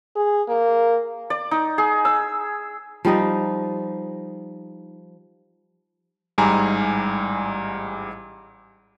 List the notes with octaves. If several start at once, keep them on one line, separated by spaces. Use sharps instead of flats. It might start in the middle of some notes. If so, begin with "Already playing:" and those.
G#4
A#3
D5
D#4
G#4
E6
F3 G3 D#4 D#5
A1 G#2 G3 G#5 A#5